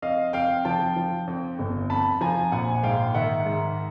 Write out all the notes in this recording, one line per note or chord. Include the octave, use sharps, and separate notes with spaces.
F2 D#5 F5
F2 F5 G5
F3 G5 A5
F3
F2
G1
F2 A5 B5
F3 G#5 A#5
A#1 F#5 G#5
G#2 F5 G5
D#3 E5 F#5
G#2